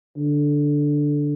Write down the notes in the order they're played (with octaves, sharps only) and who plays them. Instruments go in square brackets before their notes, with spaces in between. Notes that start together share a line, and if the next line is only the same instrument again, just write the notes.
[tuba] D3